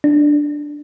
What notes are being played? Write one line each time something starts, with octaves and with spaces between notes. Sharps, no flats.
D4